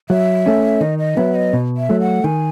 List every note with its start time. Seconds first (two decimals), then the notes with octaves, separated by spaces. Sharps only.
0.10 F#3 E5
0.46 A3 C#4
0.81 D#3 D#5
0.99 D#5
1.17 F#3 B3 E5
1.35 D#5
1.53 B2
1.77 E5
1.89 F#3 A3
2.00 F#5
2.24 D#3 G#5